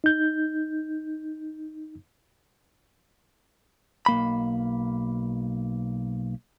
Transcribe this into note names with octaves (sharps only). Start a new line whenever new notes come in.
D#4 G6
B1 A#3 B5